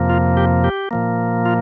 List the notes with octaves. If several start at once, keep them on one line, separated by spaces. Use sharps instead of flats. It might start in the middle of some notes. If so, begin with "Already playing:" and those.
Already playing: F2 C3 F3 A#3
F4
G4
G4
A#2 F3 A#3
F4